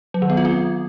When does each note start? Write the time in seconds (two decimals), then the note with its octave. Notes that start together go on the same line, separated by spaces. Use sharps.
0.14 F#3
0.22 D#3
0.30 B3
0.37 F4
0.45 C4